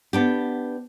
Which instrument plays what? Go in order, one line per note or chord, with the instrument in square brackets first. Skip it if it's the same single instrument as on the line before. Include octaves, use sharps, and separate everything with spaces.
[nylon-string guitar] B3 D4 G4